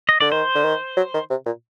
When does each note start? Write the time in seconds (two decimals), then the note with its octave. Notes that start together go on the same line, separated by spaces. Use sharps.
0.09 D#5
0.20 D3 D5
0.32 D#3 C5
0.55 D3
0.64 D#3
0.97 F#3
1.14 D#3
1.30 C3
1.46 A#2